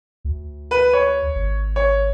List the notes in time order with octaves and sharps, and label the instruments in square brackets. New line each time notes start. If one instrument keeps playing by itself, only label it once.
[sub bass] D2
[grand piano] B4
C#5
[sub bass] G#1
[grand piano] C#5